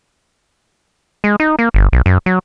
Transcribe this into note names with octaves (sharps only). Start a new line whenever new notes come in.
G#3
D#4
A#3
G1
B1
F#2
F#3